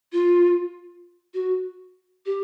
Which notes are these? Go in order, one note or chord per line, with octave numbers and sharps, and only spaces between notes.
F4
F#4
G4